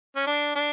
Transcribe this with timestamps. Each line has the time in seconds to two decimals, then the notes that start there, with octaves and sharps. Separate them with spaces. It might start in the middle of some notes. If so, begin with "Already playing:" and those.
0.16 C#4
0.27 D4
0.55 D4